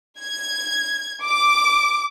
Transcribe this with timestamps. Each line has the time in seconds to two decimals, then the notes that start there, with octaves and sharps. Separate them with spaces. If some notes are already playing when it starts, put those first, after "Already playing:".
0.20 G#6
1.26 D6